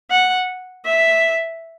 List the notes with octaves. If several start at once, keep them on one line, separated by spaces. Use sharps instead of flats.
F#5
E5